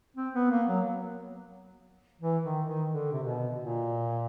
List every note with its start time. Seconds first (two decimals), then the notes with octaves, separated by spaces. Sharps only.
0.17 C4
0.34 B3
0.51 A#3
0.68 F#3
2.21 E3
2.44 D#3
2.67 D#3
2.90 D3
3.12 C3
3.23 B2
3.58 A#2